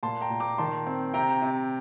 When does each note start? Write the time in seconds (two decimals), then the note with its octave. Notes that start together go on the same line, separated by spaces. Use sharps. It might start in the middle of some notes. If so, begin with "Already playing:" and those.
0.03 A#2 A5 C6
0.21 G5 A#5
0.30 A#2
0.40 A#5 D6
0.58 D#3 A5 C6
0.86 C4
1.14 C3 G5 A#5
1.42 C3